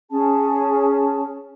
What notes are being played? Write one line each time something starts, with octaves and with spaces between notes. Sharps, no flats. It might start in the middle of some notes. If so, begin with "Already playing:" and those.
C#4 G#4 A5